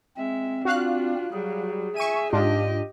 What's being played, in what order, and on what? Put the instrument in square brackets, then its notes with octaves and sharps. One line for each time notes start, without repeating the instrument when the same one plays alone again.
[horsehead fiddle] G#3 E5 [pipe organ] C4
[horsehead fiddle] D4 F4 [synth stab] F#4 F5 F#6
[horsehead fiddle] F#3 G3 [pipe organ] G#4
[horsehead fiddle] E5 G#5 [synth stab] C#6 D#7
[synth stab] G#2 D4 F4 [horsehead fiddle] G4 D#5